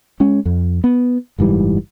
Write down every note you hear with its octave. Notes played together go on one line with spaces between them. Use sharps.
G#3 C#4
F2
B3
F#1 G#2 E3 G3